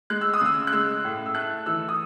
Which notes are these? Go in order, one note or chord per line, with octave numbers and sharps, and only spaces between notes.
G#3 F#6
E6
D#6
C#3 E6
F#6
G#3 E6
A2
E6
A3 F#6
E3 E6
D#6